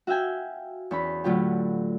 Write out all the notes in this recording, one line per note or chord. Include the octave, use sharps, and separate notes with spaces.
F#4 E5 F5 G5 G#5
E2 C#4 B5
A2 D3 F#3 F4 G4